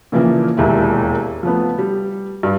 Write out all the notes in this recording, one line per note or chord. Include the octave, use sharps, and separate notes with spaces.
A#2 C#3 E3 F3 A#3
E1 D#2 A#2 E4
F3 A3 B3
G3
G2